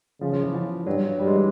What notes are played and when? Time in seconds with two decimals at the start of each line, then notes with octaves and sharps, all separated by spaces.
0.21 C#3 F3
0.33 F3
0.43 E3
0.55 F3
0.86 G2 F#3
1.19 G2 G3
1.27 G#3
1.35 E3